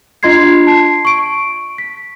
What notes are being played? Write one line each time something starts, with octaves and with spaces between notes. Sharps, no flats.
D4 F4 D#5 C6 G#6 C7
A5 C7
C#6 D7
B6